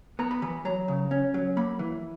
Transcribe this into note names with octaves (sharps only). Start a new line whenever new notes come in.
B3 A#5
B5
E3 B5
F#3 A#5
C#3
C#4
F#3
A#3 B5
E3